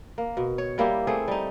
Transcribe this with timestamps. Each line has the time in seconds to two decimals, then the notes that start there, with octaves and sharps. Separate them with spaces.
0.18 A#3
0.37 B2
0.58 C#5
0.78 G3 A#3 E4 G4
1.07 A3 C4 G#4
1.28 G3 D#4